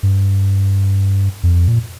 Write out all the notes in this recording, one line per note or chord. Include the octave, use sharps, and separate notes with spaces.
G2
F2
A#2